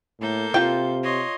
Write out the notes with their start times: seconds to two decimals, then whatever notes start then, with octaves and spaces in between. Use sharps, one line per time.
0.21 A2 A#3 A4 G6
0.54 C3 F4 G5
1.03 C#5 D#5 C6